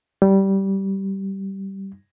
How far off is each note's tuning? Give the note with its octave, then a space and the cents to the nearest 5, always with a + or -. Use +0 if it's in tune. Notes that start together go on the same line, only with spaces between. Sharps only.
G3 -15